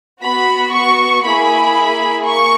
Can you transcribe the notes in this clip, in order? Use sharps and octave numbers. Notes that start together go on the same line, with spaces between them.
B3 F#4 B5
C#6
A#3 E4 G#4 B5
A#3 C#6